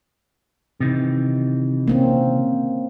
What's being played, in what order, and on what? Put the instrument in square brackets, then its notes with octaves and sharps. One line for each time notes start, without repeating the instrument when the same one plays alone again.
[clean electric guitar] C3 D#3 E3
[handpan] A#3 C4 C#4